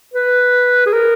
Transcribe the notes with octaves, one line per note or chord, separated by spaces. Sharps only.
B4
G#4
A#4